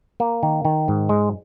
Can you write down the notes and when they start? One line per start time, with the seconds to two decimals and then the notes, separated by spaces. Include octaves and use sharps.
0.20 A#3
0.43 D#3
0.65 D#3
0.88 G#2
1.09 G#3